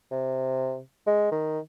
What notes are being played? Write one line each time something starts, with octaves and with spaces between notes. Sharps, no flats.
C3
G#3
D#3